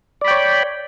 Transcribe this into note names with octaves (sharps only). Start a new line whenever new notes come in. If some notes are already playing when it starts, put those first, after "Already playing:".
C#5 D5 G5 B5